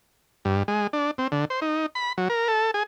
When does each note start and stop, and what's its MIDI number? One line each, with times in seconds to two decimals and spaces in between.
0.45 0.63 43
0.68 0.87 56
0.93 1.11 62
1.18 1.27 60
1.32 1.45 50
1.50 1.60 72
1.62 1.86 63
1.95 2.13 83
2.18 2.28 54
2.30 2.48 70
2.48 2.71 69
2.74 2.83 68